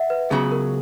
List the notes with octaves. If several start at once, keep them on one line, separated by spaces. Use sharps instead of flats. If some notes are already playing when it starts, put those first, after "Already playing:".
Already playing: E5 F#5
B4
C#2 C#3 F#3 B3 G#4
A#4